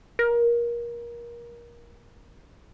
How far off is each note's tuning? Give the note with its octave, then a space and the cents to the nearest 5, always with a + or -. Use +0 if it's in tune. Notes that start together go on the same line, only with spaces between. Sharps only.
A#4 +25